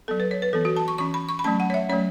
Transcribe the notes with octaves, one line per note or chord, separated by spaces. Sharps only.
F#3 B3 A4
B4
C#5
B4
E3 B3 A4
F#4
A5
C#6
E3 C#4 C#6
B5
C#6
B5
F#3 A3 C#4 A5
F#5
C#5
E5
F#3 A3 C#4 C#5